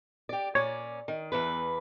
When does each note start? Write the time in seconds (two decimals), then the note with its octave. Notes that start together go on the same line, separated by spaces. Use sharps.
0.29 G4 D5
0.55 A#2 C#4 C#5 D5
1.08 D#3
1.32 E2 E3 B4